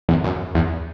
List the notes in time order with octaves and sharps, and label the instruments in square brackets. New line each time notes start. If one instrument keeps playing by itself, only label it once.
[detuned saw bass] E2
F#2
E2